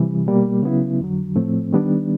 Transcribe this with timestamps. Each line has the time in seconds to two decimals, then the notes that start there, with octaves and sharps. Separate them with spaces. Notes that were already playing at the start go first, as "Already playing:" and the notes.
Already playing: C3 E3 G3
0.26 B2 G3 A#3
0.63 C#3 F#3 B3 E4
1.00 F2 D3 F#3
1.36 A2 F3 A3 C4
1.73 D#3 G3 B3 D4